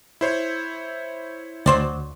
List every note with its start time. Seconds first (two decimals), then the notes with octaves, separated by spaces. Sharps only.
0.21 E4 C5 C#5
1.66 D2 F#3 C5 D5